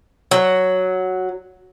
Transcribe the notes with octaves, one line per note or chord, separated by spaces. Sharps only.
F#3